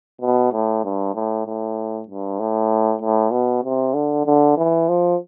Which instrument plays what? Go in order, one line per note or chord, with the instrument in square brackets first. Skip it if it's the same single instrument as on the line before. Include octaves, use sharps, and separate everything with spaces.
[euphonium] B2
A2
G2
A2
A2
G2
A2
A2
B2
C3
D3
D3
E3
F3